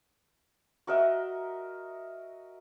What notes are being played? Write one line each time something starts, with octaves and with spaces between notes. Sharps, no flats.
F#4 A#4 D#5 E5